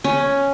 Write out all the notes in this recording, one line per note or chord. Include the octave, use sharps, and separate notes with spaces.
C#4